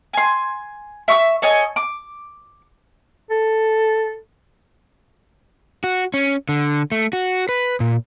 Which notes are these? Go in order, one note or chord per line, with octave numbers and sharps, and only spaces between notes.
G#5 C6
E5 C#6 D6 E6
A4 C#5 D#5 G#5
D6
A4
F#4
C#4
D3
A3
F#4
B4
A#2